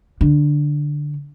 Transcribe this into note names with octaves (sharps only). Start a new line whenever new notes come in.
D3